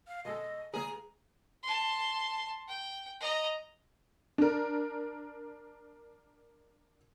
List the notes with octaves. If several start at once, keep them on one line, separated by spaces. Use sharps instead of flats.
F5
B2 G#3 A4 D#5
C#2 G#4 B4 A#5
A5 C6
G5
D#5 A#5
D4 A#4